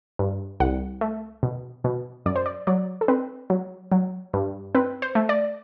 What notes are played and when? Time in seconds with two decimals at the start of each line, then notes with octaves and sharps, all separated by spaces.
0.19 G2
0.60 C2 F#5
1.01 A3
1.43 B2
1.84 B2
2.26 F#2 D5
2.36 C5
2.46 D5
2.67 F#3 D5
3.01 A4
3.08 C4 B4
3.50 F#3
3.92 F#3
4.33 G2
4.75 C4 B4
5.02 C5
5.15 A3
5.29 D5